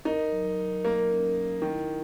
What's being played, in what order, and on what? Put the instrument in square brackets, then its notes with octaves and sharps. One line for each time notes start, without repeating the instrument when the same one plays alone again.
[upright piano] D#4 [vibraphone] A#4
[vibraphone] F#3
F#3
[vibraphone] F#3 [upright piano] A#3
[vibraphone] C#4
A#4
[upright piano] D#3 [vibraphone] E4